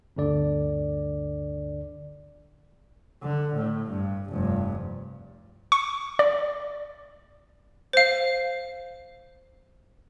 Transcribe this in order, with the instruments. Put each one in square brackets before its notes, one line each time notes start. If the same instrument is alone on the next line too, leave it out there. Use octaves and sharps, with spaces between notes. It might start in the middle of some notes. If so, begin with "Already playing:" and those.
[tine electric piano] G1 D2 D3 D5
[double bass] D3
A2
G2
F1 G2
[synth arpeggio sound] C#6
D5
[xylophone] C5 F5